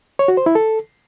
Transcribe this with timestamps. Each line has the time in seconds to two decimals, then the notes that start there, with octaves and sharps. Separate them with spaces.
0.19 C#5
0.28 F#4
0.37 C5
0.46 E4
0.55 A4